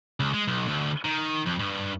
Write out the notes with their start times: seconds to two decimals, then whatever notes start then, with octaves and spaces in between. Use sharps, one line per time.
0.20 C#2
0.34 G#3
0.48 B1
0.68 D2
1.05 D#3
1.47 F2
1.60 G2